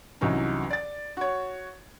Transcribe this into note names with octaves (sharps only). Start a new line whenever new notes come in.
C2 E3 F#3 C#4 D#4
D5 A6
F#4 C#5